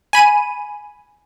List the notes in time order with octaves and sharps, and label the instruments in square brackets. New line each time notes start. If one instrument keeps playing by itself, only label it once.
[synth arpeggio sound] G#5 B5 D#7